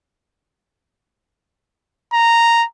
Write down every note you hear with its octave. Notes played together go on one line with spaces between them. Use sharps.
A#5